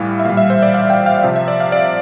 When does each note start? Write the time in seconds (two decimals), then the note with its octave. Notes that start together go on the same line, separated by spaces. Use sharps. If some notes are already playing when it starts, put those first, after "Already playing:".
Already playing: A2 E3 G3 F5
0.20 E5
0.25 A#2 G3 F5
0.37 E5
0.50 C5
0.62 D5
0.74 F5
0.90 G5
1.06 F5
1.18 F5
1.23 C3 F3 E5
1.36 E5
1.48 D5
1.60 F5
1.72 D5